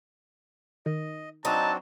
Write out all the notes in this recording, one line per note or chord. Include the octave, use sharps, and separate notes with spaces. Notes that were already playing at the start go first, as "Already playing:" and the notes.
D#3 D#5
F#3 C4 D4 D#4 A5